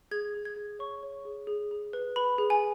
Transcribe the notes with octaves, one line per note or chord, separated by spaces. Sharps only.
G#4 G#6
G#4
G#6
G#4
C#5 C#6
C#5
G#4
G#4
G#4
B4
B4 B5
G#4
G#5